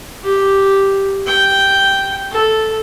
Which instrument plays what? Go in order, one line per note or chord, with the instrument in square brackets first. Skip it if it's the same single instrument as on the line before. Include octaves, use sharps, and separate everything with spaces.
[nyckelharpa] G4
G5
A4